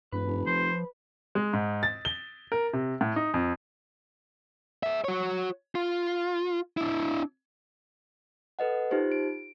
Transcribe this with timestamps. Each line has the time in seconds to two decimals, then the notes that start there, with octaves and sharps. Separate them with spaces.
0.12 E1 G2 B4
0.26 F1
0.47 F3 C5
1.35 G#3
1.53 G#2
1.83 A6
2.05 G7
2.52 A#4
2.73 C3
3.01 A2
3.16 D#4
3.34 F2
4.83 G#4 E5
5.04 F#4 C#5
5.75 F4
6.77 D4 E4
8.59 A4 B4 D#5 F#5
8.91 D#4 F4 G4 C5
9.12 D7